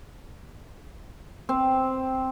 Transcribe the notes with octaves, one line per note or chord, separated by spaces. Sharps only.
C4